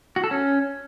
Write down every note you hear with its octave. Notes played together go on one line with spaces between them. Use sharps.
F#4
A4
C#4